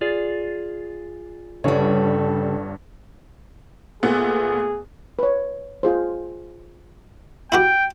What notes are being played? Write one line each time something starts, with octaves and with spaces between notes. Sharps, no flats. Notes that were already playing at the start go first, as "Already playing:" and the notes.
F4 G#4 D5
G1 G2 C#3 G3 A4 C#5
A#2 A3 B3 G#4
B4 C#5
F4 G#4 C5
E4 F#4 G4 G5